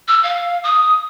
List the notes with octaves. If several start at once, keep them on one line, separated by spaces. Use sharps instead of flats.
E6
F5
D#6